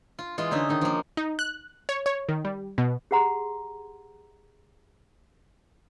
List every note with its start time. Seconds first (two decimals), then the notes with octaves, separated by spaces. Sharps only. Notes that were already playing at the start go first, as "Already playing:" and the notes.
0.19 F4
0.38 E3 G#3 F4
0.51 D3 C#4 D#4 E5
0.69 D#3 D#4
0.81 F3 A#3
1.17 D#4
1.39 F#6
1.89 C#5
2.06 C#5
2.29 D#3
2.45 G3
2.78 B2
3.11 G4 G#4 F#5 A#5 C6